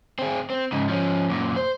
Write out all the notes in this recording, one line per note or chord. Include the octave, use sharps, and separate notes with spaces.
C4 G#4
C4
G#2 C#3
F3 C#4
F#2 A#2
C5